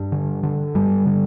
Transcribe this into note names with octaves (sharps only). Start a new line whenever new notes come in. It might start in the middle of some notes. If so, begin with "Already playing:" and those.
Already playing: G2 G3
D3
D3
G2 G3
D3